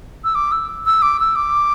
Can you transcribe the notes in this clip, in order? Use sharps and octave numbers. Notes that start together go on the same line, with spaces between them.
E6
D6
E6
E6
D6
E6
D6